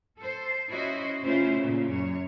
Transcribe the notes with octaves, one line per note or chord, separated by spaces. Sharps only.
A4 C5
C#4 E4 F#4 C5 D#5
C#3 A3 C#4 E4 F4 C5
A#2 C#3
F#2 C#5